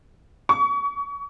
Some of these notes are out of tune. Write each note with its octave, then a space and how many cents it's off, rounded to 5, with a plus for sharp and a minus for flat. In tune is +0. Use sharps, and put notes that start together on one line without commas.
C#6 +30